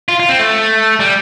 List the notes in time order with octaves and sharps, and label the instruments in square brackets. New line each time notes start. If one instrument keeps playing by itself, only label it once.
[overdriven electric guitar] F4
F4
C4
A3
G3